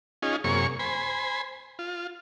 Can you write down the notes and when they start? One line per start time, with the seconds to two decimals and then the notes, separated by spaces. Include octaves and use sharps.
0.22 C#4 D#4 F4 G#4
0.44 F#2 C3 A#3 G#4 C#5 C#6
0.79 C5 G#5 B5
1.79 F4